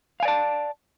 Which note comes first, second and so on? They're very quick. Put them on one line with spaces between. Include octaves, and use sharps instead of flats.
F5 G#5 D5 A5